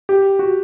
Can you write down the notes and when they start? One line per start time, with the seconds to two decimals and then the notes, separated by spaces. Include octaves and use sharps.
0.09 G4
0.39 F#4